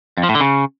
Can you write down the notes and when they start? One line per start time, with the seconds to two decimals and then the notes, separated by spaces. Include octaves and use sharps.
0.17 F2
0.23 F3
0.29 A2
0.35 D3
0.41 C#3